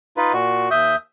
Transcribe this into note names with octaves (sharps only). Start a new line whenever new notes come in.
D#4 F4 B4
A#2 F#4
D#2 E5 D#6 G6